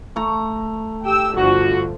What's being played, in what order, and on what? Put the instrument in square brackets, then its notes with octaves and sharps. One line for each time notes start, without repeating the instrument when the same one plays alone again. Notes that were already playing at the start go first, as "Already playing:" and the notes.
[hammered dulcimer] A3 A#5
[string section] G4 G5 E6
[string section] G1 D3 F3 [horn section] F#4